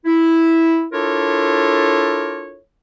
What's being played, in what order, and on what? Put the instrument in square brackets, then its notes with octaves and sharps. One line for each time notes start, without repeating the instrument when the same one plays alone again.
[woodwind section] E4
D4 E4 F4 A4 A#4 C#5